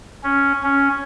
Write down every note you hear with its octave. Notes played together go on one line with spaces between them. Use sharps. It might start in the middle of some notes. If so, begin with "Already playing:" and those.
C#4
C#4